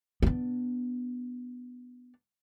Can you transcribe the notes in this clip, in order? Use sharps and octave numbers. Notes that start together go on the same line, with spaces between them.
B3 D4